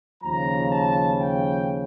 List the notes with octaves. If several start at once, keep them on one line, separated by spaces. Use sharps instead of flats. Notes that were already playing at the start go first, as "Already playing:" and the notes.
D#2 C#3 F3 A#5
A5
G5